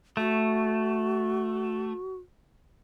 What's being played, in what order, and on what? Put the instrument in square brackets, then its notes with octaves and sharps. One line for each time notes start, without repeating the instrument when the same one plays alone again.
[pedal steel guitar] A3 [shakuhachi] F#4